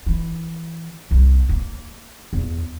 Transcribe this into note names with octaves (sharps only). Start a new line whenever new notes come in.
E3
C2
A#3
E2